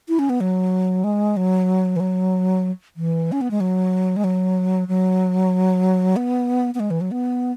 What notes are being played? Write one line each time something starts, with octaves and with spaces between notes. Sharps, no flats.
E4
C#4
B3
F#3
G#3
F#3
E3
F#3
E3
C#4
B3
G#3
F#3
G#3
F#3
F#3
B3
B3
G#3
E3
F#3
B3